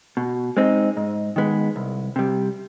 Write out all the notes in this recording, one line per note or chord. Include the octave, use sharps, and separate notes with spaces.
B2
G#3 C4 D#4
G#2
D#3 G#3 B3
C2
C3 G3